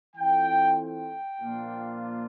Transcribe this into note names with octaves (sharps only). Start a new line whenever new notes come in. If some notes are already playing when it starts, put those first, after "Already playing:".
E3 A3 C4 F4 G5
G5
A#2 F3 A#3 D4 F4